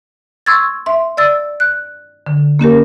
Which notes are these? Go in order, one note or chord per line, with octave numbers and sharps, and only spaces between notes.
C6 C#6 E6 G#6 A6
E5 C6
D5 E6 A6
F#6
D3
A#3 C#4 G4 A#4